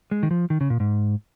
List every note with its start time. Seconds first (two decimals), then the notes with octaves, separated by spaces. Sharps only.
0.11 G#3
0.23 D#3
0.31 F3
0.50 D#3
0.61 C#3
0.70 A#2
0.80 G#2